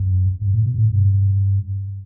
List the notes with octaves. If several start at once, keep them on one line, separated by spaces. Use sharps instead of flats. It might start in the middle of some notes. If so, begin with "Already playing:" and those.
Already playing: F#2
G2
A2
B2
A2
G2